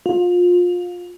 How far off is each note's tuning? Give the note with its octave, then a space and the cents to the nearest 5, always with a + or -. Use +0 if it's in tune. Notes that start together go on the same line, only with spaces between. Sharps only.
F4 +25